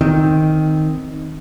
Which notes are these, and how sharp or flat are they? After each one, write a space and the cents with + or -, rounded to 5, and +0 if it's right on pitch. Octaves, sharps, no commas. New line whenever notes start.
D#3 +0 C4 +0